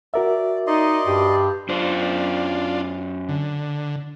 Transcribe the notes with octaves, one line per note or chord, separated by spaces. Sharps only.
F#4 A#4 D5 E5
D#4 D5 D#5 C6
G2 G4
F#2 D4 F4 C5
D3